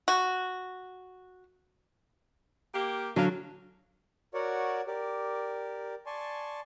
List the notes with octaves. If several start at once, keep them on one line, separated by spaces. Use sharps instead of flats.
F#4
A#3 G4
D3 F#3 A#3 C#4 F5
F#4 A#4 C#5 D5 F#5
G4 A#4 D5
D5 G#5 A5 C6 C#6